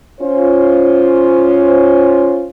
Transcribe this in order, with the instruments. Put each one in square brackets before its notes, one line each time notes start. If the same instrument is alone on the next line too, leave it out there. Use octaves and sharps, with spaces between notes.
[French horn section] C#4 F4 C5